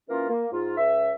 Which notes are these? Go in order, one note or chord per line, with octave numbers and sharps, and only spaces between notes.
E3 A#3 C#4 F4 A#4
A#3
G#2 F4
C#2 E5